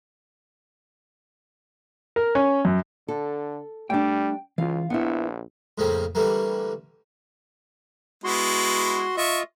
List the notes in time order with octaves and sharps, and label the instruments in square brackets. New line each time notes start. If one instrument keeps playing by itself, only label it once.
[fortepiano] A#4
C#4
F#2
[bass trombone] D3 [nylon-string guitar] A4
[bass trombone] G3 [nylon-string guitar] A3 D4 [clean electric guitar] G5
[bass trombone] C#2 [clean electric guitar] E3 F4 [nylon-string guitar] F5
[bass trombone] A#1 [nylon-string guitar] B3 E4 [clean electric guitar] D4 F#5
[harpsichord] F2 A2 C#3 F3 A#3 C4
D3 E3 G3 A3 A#3
[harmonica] G#3 B3 E4 [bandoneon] F#4 C6
[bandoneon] F4 D#5 [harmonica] E5 C#6